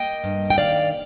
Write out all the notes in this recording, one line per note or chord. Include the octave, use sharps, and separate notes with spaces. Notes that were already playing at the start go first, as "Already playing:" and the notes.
Already playing: A#3 D#5 G5
G2
G5
D#3 D5 F5